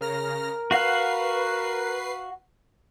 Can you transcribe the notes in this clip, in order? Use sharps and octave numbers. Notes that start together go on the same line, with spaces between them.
C#3 A#4 F6 A#6
F#4 B4 F5 F#5 C7